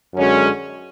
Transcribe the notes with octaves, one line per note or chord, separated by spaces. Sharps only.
F#2 D3 G#3 C#4 F#4